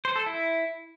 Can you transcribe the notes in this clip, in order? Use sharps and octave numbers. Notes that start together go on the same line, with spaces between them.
C5
A4
E4